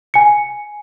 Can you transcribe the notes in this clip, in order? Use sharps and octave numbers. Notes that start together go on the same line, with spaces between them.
G#5 C#7